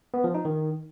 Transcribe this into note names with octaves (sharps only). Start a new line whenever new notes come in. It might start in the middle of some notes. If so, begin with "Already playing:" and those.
B3
F3
D#4
D#3